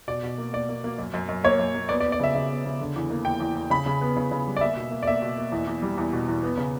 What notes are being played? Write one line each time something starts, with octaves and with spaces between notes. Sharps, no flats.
B2 D5
B2
A#3
A#3 D5
A#3
A#3
F#2
F#2
F#2
A#3 C#5
F#2
A#3
B3 D5
D5
B3
D5
C#3 E5
C#3 E5
B3
C#3
D3
E2
A#3
E2 G5
E2
E2
C#3 B5
C#3
B3
C#3
C#3
G3
D5
A#3 E5
B2
A#3
D5
A#3 E5
B2
A#3
E2
E2
G3
E2
B2
E2
B3
C#3